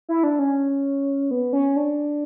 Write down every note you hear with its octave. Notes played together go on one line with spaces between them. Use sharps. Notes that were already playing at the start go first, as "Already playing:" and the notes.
E4
D4
C#4
B3
C#4
D4